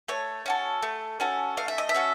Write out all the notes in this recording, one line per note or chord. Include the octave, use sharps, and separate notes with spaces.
A3 C#5
C#4 F#4 A4
A3
C#4 F#4 A4
A3 F5
E5
D#5
E5
C#4 F#4 A4